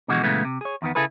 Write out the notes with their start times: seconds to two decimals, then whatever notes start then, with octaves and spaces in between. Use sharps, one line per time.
0.08 B2 D3 E3 F3 G#3 F#4
0.23 A#2 C#3 E3 G#3 A3 B3
0.45 C3
0.61 G#4 C#5
0.82 E2 D#3 B3
0.95 C#3 E4 G#4 A4 B4